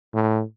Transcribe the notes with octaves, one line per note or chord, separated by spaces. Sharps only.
A2